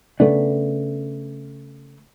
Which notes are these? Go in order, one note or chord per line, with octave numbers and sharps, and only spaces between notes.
C#3 A3 B3 D4